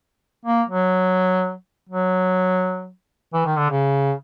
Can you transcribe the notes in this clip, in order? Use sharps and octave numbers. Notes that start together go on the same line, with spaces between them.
A#3
F#3
F#3
E3
D#3
D3
C#3